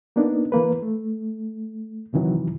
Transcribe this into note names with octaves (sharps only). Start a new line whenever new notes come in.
A#3 B3 D4 D#4
E3 A#3 B4
A3
F#2 C3 D#3 E3 F#3